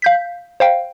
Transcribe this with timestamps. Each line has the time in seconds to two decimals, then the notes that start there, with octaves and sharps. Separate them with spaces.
0.02 F5 G6 B6
0.60 C5 F5 G5